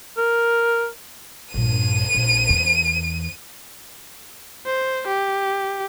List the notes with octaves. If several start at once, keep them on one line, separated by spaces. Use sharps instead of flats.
A#4
A#1 G2 D#7
A#1
E2
C5
G4